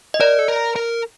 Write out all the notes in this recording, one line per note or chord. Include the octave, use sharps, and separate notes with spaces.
D#5
A#4 D5
A4
A#4
A#4